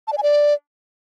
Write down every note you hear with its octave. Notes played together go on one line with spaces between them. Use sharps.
A5
D5
G#5
D5